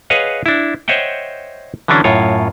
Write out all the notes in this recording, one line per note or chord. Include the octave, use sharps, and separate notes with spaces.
G#4 B4 C#5 D#5 F5 F#5
D4 E4
C5 C#5 D#5 E5 F#5 G5
D3 E3 F#3 C#4 D4
F#2 A2 F4 C#5